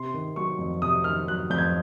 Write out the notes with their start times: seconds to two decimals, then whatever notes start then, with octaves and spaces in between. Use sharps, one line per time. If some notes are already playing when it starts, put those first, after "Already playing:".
Already playing: C3 C6
0.14 D#3
0.36 F#3 C#6
0.59 F2
0.82 C3 D#6
1.04 D#3 F6
1.27 F#3 F#6
1.50 F2 G6
1.58 G#6